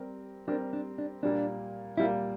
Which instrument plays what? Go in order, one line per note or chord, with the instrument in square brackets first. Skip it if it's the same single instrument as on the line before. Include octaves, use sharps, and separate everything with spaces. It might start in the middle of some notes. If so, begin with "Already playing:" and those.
Already playing: [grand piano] G3 C4 G4 A#4
[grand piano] G3 C4 G4 A#4 [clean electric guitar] D4
[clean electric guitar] D4
D4
[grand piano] A#2 G3 A#3 [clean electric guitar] D4
[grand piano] A#2 G3 A#3 [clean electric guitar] E4